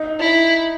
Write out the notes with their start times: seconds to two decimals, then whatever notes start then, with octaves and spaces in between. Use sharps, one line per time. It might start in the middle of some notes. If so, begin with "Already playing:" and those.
Already playing: D#4
0.20 E4